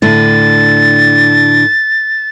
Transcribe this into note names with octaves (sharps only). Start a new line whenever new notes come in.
A2 D3 A6